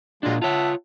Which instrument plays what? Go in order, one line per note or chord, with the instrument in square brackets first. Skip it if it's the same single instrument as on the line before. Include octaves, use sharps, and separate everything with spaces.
[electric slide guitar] A#2 D4 [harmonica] F#3 G#3 F4
[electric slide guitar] F4 C#5 [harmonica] E5 F#5 A5